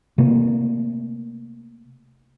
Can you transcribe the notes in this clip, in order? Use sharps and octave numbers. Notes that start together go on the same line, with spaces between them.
C3 A3 A#3